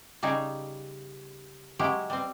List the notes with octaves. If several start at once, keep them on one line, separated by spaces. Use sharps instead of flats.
C#3 G3 D#4 G4 G#4
F#3 G#3 E4 G4
G3 C4